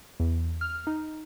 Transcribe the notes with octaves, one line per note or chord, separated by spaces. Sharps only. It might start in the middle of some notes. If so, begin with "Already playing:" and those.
E2
F6
D#4